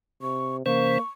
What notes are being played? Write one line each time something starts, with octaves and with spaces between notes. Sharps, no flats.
C3 C#6
C3 E3 A#3 C#4 C5 C#6